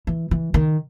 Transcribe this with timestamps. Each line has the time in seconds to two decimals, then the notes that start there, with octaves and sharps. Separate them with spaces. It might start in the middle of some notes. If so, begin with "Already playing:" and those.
0.07 E3
0.31 E3
0.54 D#3